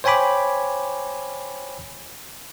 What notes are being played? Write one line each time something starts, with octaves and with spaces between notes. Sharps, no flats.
C5 C#5 G5 G#5 B5 D6